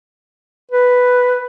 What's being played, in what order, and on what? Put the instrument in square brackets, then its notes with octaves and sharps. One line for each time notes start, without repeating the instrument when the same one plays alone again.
[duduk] B4